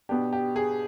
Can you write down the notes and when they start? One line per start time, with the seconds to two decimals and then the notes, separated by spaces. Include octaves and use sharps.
0.09 B2 B3 D4 G4
0.33 G4
0.56 G#4